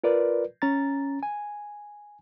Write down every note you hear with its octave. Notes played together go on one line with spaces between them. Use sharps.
F4 A#4 B4 D5
C#4 A#5 A6
G#5